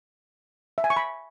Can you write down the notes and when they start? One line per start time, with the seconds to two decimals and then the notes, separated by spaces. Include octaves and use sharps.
0.78 E5
0.84 G#5
0.90 C#6
0.97 B5